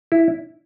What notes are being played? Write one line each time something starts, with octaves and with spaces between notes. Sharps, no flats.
E4